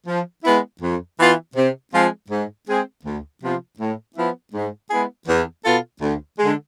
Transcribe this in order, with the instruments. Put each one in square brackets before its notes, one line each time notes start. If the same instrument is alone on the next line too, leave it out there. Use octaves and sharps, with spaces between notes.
[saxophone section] F3
G#3 B3 E4
F2
E3 B3 F4
C3
F3 G#3 C4 F4
G#2
G#3 C4 G#4
D2
C3 F3 B3 F4
A2
F3 B3 E4
G#2
G#3 B3 E4 G#4
E2
B2 B3 F4 A4
D2
D3 G#3